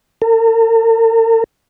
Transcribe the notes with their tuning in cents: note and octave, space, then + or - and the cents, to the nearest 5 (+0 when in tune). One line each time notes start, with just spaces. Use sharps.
A#4 -45